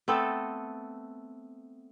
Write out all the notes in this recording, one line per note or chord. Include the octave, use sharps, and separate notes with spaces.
A3 B3 C4 A4